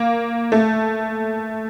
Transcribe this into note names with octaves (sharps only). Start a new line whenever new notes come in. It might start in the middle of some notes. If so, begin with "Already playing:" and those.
Already playing: A#3
A3